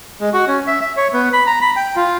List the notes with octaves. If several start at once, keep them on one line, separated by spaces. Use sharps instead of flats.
G#3
F#4
C#4
E5
E5
C#5
B3
B5
A#5
B5
G5
F4